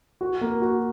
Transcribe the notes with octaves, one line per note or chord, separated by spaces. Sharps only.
F#4
A#3
F#4